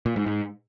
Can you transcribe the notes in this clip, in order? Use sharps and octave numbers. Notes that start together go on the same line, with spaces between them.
A#2
G#2
G#2